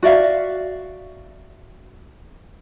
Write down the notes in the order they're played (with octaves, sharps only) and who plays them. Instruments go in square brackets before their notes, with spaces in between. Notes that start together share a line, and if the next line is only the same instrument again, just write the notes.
[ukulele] F#4 D5 E5 F5